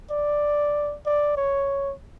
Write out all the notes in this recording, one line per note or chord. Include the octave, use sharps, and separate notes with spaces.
D5
D5
C#5